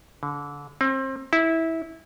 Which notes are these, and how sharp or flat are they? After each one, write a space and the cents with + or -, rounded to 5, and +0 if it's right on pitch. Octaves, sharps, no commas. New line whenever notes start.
D3 -30
C4 +30
E4 -15